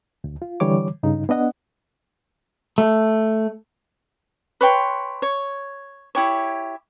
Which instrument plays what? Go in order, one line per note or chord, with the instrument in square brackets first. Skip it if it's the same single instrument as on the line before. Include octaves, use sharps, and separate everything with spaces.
[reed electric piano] D2
F4
D3 E3 G3 C#5 D6
G2 C#3 D#4
B3 D4 D#5 F#5
[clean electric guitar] A3
[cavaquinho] B4 C#5 G5 C6
C#5
E4 G4 C#5